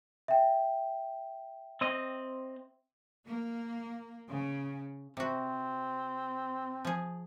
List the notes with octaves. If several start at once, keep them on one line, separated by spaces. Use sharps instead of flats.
E5 G5
C4 D#5
A#3
C#3
C3 C4 F#4
F3 G#4